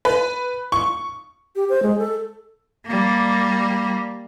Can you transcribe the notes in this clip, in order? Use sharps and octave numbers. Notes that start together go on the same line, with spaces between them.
B4
C#6
G4
C5
G#3
A4
G3 A#3